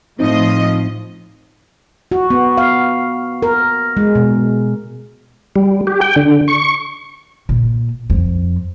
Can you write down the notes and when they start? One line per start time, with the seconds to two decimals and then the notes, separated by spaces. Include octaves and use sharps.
0.19 A2 F3 C4 D#4 D#5
2.12 F#4
2.30 B3
2.57 F5
3.42 A#4
3.97 G#3
4.15 B2
5.56 G3
5.87 G4
6.01 G5
6.16 D3
6.48 C#6
7.49 A#2
8.10 F2